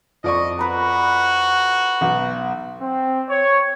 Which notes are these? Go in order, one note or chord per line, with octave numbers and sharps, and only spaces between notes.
F2 D5 D#5 C#6
F#4 B4 A#5
B1
C4
C#5